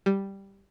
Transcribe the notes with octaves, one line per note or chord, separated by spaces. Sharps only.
G3